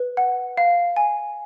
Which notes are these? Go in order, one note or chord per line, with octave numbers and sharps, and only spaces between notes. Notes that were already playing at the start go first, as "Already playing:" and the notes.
Already playing: B4
F#5
F5
G#5